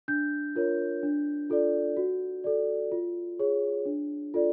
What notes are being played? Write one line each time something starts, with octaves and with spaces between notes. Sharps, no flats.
D4 G6
F4 A#4 C#5
D4
F4 A4 D5
F#4
A4 D5
F4
G#4 C#5
D4
F4 A4 D5